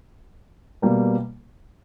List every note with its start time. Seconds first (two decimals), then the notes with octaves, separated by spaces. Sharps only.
0.82 B2 G3 A#3